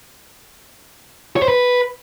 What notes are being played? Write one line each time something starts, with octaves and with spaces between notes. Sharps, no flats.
C#5
C5
B4